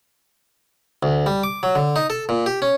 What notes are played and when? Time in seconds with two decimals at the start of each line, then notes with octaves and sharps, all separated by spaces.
1.03 D2
1.26 G3
1.43 D6
1.63 F#3
1.75 D3
1.96 D#4
2.10 A4
2.29 A#2
2.46 G4
2.62 C#4